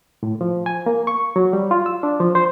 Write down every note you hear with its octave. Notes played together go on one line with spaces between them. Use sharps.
A2
F3
G#5
A#3
C#6
F#3
G3
F4
E6
D4
F3
C5